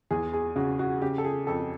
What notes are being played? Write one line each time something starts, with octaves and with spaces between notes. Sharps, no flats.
E2 G#4
G#4
C#3 F#4
F#4
C#3 G4
A4
G#4
F2 A4